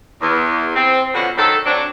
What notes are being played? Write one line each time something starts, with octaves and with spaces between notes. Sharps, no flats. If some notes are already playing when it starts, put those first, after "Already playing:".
E2
C4
B2 D3 F3 C#4 F#4
D#3 F#3 A4
F#3 C4 D4